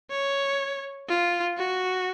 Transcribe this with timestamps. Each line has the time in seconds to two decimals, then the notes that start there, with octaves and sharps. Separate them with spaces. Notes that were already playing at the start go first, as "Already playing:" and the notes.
0.11 C#5
1.09 F4
1.57 F#4